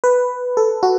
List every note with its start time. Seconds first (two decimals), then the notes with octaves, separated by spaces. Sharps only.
0.04 B4
0.57 A4
0.83 F#4